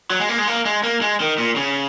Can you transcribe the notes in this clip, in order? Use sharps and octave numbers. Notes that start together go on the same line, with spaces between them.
F#3
G#3
A#3
G#3
A#3
G#3
A#3
G#3
D#3
A#2
C#3